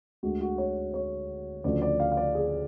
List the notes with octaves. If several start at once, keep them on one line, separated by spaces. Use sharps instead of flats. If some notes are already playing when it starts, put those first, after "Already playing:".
D2 D3 G#3 F#4
F#4
C#5
C#5
D2 C#3 F3 D5
D5
F5
F5
D5
G#4